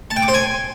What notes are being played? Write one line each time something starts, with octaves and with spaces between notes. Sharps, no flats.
A5
G5
D6
C5
G#5